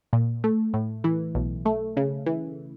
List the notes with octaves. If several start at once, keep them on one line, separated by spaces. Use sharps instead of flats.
A#2
A3
A2
E3
B1
A3
C#3
E3